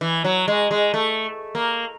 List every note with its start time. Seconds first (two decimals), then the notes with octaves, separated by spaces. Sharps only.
0.01 E3
0.24 F#3
0.48 G#3
0.71 G#3
0.94 A3
1.55 A#3